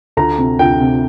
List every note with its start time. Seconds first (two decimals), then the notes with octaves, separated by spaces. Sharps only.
0.17 D2 A#5
0.38 C3
0.59 D2 G5
0.81 C3